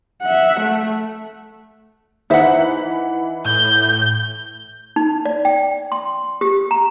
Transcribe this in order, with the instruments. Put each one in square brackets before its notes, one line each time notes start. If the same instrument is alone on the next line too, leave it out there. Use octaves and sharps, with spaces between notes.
[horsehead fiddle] E5 F#5
A3
[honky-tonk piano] E3 F#5 [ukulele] D#4 C5 E5
[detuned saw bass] A2 [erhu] G6
[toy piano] D#4
D5
G5
C6
G4
A#5